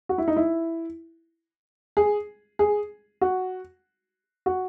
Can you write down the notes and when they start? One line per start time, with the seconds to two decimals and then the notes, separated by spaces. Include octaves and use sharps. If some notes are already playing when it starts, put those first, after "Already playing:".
0.09 F#4
0.18 E4
0.28 D#4
0.36 E4
1.97 G#4
2.59 G#4
3.21 F#4
4.46 F#4